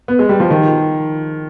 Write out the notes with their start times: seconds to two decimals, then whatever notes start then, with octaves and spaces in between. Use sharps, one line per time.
0.08 B3
0.19 G#3
0.29 G3
0.40 F3
0.50 D#3